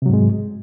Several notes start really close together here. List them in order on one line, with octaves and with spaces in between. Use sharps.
C3 F#3 G#2 G#3